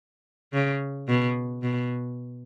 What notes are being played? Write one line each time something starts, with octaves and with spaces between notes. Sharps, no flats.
C#3
B2
B2